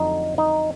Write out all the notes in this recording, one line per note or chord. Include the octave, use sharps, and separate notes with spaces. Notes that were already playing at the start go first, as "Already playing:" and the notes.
Already playing: F2 D3 F#3 A3 D#4
D#4